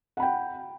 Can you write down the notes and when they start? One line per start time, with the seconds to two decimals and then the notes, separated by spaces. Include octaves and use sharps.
0.17 F#5
0.20 B5
0.22 G5